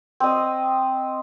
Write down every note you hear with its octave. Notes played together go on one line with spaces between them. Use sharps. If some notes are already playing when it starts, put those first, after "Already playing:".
C4 D#5